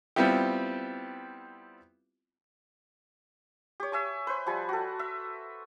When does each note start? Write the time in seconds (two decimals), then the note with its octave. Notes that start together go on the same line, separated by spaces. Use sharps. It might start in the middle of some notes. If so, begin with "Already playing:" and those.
0.16 G3 B3 C4 E4 F4 G4
3.80 G4 C#5
3.92 E5 G#5 C#6
4.27 B4 C5
4.46 F3 G3 G#5
4.69 F#4 A4
4.99 E5